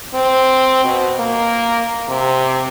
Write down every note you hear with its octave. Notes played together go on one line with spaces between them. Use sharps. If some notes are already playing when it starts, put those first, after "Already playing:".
C4
B2
A#3
C3